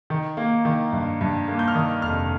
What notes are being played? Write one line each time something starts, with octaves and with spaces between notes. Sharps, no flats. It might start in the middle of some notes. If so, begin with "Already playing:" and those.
D#3
A#3
D#3
G2
G2
A#3
G6
F6
D#3 D#6
F1 F6